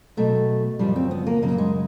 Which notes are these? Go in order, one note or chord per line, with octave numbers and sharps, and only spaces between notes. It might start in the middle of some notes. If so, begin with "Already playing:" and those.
B2 F#3 A3
F#2 C#3 F3 G3
C4
B3
A#3
F#2 C#3 F#3 A#3
G#3